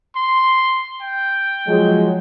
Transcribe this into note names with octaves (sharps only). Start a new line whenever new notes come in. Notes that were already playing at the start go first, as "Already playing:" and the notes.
C6
G5
F3 F#3 G#3